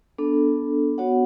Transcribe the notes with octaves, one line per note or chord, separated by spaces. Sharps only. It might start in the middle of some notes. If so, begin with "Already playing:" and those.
B3 D4 A4
B3 F#4 C#5 F#5